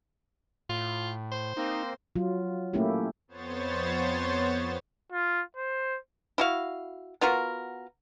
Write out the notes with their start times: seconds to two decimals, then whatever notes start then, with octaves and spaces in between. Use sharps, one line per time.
0.69 A2 F4
1.32 C5
1.57 A#3 C4 D#4
2.16 F#3 F4
2.74 A3 A#3 C#4 E4 G4
3.28 F2 B3 C5 C#5 A6
5.12 F4
5.56 C5
6.38 E4 F#4 F5
7.21 B3 F4 F#4 A#4